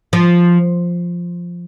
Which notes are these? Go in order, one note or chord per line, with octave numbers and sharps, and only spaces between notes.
F3